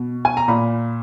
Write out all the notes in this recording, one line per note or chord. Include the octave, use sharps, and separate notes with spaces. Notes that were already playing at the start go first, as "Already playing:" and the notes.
Already playing: B2
G#5
A#5
A#2 B5